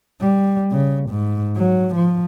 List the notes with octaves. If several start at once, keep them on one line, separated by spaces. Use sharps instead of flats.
G3
C#3
G#2
F#3
F3